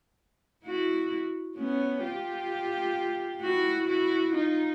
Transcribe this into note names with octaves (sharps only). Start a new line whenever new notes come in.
E4 F#4
B3 C#4
F4 G4
E4 F#4
E4 F#4
D#4 F4